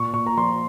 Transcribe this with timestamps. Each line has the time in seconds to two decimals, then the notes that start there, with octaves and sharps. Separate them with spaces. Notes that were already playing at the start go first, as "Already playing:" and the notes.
Already playing: A#2 C#6
0.13 A#2 C#6
0.27 A#5
0.37 F3 C6